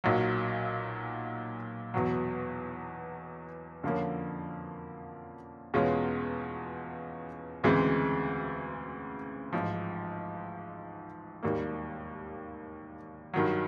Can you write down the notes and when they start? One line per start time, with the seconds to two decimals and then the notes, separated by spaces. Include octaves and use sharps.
0.04 B1 A#2 F#3
1.94 E2 B2 F#3
3.84 F2 D3 F3 A#3 C#4
5.74 E2 B2 G#3 C#4 F4
7.63 D2 C#3 E3 G#3 C4
9.53 A1 G#2 F3
11.43 E1 D#2 D#3 G3 A#3
13.34 G2 D#3 F#3